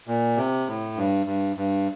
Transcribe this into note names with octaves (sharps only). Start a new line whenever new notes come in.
A#2
C3
A2
G2
G2
G2